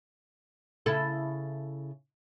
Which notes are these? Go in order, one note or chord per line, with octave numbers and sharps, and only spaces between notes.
C#3 E4 A4